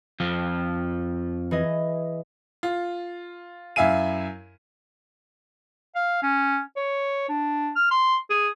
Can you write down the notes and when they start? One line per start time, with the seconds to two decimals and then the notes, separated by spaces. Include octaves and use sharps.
0.20 F2 F3
1.51 E3 G#4 D#5
2.63 F4
3.76 F#2 E4 E5 F5 G#5 D#7
5.95 F5
6.22 C#4
6.77 C#5
7.29 D4
7.76 F6
7.91 C6
8.30 G#4